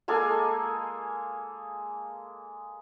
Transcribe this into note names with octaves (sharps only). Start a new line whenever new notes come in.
G#3 A#3 A4 G#5